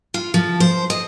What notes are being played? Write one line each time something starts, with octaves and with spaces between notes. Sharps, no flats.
F4
F3
C5
D#5